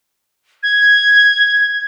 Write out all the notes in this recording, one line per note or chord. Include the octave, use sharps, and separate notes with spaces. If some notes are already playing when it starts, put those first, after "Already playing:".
G#6